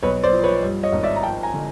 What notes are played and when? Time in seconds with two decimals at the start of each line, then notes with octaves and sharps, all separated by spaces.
0.03 B1 B4 C#5
0.24 C5 D5
0.33 F3
0.44 B4 C#5
0.63 G2
0.83 C#5 D#5
0.93 G#1
1.03 D5 E5
1.16 A#5
1.23 F3 G5 A5
1.43 G#5 A#5
1.54 D3